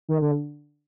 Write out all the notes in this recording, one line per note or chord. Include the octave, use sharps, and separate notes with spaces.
D#3
D3